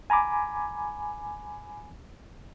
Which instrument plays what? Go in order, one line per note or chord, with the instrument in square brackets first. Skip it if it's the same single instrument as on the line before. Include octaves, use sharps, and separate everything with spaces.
[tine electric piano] G#5 A#5 B5 D6